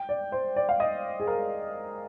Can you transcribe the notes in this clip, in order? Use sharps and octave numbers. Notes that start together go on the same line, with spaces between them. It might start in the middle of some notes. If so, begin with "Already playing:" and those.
Already playing: G5
D5
C5
D5
F5
D#5
G#4
A#4